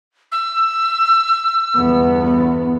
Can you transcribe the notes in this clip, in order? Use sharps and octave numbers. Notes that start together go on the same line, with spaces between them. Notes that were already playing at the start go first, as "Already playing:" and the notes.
E6
G1 E2 B3